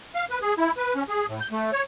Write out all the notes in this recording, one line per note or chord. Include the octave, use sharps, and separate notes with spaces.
F5
B4
G#4
E4
B4
C#4
G#4
A2
G6
A3
C#5